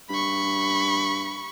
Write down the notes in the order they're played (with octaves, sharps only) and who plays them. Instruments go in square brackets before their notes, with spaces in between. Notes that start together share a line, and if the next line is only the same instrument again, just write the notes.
[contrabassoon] G2 [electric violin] B5 C#6